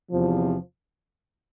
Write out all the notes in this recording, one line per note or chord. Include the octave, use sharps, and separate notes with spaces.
E2 C3 F3